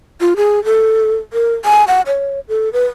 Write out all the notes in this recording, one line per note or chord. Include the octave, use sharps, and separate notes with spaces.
F4
G#4
A4
A#4
G#5
F#5
C#5
A4
B4